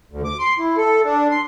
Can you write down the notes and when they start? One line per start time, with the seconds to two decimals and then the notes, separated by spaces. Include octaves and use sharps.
0.11 D2
0.25 D6
0.39 C6
0.59 E4
0.77 A4
1.05 D4
1.31 C6